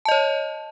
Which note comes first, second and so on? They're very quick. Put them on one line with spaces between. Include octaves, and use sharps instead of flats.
A5 D#5 C#5